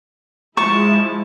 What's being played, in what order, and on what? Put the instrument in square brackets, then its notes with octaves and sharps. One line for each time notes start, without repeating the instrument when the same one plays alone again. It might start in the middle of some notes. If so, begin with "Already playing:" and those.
[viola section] F3 G#3 E4 [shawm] A5 [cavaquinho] C#6